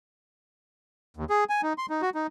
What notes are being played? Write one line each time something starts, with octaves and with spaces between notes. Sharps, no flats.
D#2
G#4
G#5
D#4
C6
D#4
F#4
D#4